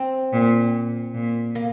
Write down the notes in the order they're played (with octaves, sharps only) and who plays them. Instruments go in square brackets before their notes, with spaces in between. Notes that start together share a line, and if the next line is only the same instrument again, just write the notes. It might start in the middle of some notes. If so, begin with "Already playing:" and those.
Already playing: [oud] C4
[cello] A#2
A#2
[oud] A#3